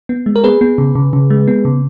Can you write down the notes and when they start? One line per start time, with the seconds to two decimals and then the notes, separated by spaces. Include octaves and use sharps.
0.09 B3
0.26 G#3
0.36 A#4
0.44 B3 G#4 B4
0.61 B3
0.78 C#3
0.95 C#3
1.13 C#3
1.30 G#3
1.48 B3
1.65 C#3